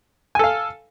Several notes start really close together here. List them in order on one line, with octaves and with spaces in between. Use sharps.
G#5 A4 F5